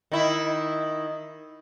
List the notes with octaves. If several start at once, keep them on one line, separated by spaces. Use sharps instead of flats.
D#3 E4